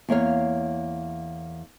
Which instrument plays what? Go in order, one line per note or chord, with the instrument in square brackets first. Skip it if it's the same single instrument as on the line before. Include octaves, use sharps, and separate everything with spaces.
[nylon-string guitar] E2 A#3 C#5 F5